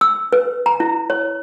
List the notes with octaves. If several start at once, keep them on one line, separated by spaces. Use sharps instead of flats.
E6
B4
A#5
E4
C#5